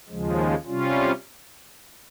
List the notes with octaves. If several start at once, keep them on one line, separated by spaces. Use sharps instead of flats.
D#2 C#3 F3 G#3
C3 G3 C#4 F4